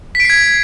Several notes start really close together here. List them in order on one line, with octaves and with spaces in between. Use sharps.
B6 D7 C7 G#6